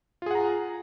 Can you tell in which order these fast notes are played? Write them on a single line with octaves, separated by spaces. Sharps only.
F4 G#4 F#5 A#5